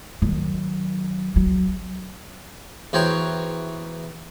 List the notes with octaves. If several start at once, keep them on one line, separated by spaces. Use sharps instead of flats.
D#3 F#3
F#3
E2 F#4 C5 C#5 G5 A#5